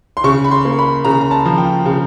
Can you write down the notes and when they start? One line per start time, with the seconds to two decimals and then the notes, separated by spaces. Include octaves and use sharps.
0.17 C6
0.24 C#3 C#6
0.44 B5
0.51 C6
0.65 A#3
0.79 B5
1.05 C#3 A#5
1.21 A#5
1.31 A5
1.45 F3
1.58 G5
1.86 C#3